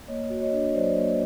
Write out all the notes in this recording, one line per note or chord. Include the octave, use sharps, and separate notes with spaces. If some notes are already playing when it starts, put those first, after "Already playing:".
A#3 C#5 D#5
F#4
C#5 D#5
D4
F#3 C5 D5
A#3